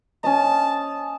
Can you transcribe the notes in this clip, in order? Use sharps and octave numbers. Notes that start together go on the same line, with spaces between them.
C#4 D#5 A5